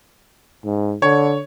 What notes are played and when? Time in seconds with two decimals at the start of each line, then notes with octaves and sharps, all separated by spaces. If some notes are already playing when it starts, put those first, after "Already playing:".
0.65 G#2
1.02 D3 C#5